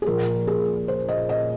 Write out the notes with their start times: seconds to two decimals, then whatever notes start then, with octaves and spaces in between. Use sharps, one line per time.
0.02 G#4
0.06 A#2 F3 A#3 A#4
0.47 G#4
0.88 C5
1.09 D#5
1.29 D#5